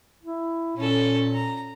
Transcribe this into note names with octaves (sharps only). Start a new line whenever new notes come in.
E4
A#2 C#4 A4
A#5